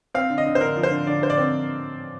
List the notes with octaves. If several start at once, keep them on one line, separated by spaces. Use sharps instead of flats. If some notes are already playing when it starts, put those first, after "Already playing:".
C4 F5
D3
D#5
D3
C5
D3 A#4
F3
C5
D3
D3 D5
D3 C5
D5
C4